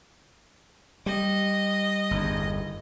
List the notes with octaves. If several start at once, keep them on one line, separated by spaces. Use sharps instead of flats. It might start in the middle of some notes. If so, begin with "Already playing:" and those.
G3 D#5
G1 E2